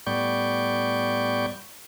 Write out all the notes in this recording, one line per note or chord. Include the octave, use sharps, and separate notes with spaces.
A2 G3 B3 D5 C#6 G6